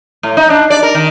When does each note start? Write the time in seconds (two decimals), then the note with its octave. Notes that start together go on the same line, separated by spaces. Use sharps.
0.23 A2
0.37 D#4
0.50 D4
0.70 D5
0.83 A#4
0.95 D#3